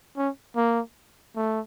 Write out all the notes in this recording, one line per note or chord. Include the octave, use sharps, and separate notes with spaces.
C#4
A#3
A3